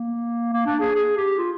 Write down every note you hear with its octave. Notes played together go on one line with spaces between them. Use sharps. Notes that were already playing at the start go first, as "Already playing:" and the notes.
Already playing: A#3
A#3
D4
G#4
G#4
G4
F4